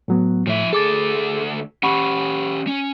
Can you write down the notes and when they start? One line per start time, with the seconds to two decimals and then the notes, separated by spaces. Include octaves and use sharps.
0.08 A2 F#3 B3
0.47 A2 F3 E5
0.73 D2 G#4 A4 D6 A6
1.83 C#4 G4 F#5 B5 C#6
2.67 C#4